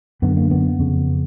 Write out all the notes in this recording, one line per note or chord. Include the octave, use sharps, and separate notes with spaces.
F#2 D3 B3
A#3
B3
F2 C#3